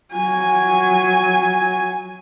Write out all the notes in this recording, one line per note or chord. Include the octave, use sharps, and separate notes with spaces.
F#3 G#5